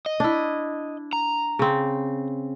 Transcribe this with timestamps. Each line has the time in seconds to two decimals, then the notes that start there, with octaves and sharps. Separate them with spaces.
0.06 D#5
0.20 D4 E4
1.13 A#5
1.59 C#3 C4